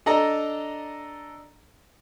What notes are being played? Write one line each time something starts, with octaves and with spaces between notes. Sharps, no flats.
D4 A4 D#5 A#5